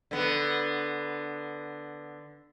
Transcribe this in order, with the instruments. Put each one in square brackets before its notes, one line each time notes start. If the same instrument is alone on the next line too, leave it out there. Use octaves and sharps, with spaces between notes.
[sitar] D3 B3